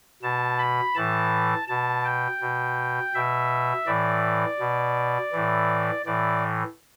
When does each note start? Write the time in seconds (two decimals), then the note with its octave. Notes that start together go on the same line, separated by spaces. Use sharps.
0.22 B2 A5
0.59 B5
0.95 A2 E3 A5
1.68 B2 A5
2.04 G5
2.41 B2
3.14 B2 E5
3.86 A2 E3 D5
4.59 B2
5.32 A2 E3
6.05 A2 E3 D5